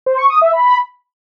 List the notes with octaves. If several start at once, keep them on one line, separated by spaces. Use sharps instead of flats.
C5
C#6
D#6
E5
B5